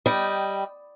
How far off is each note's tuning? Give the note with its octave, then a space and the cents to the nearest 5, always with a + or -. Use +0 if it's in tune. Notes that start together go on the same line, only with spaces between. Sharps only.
G3 +0 D#5 +0 G5 -10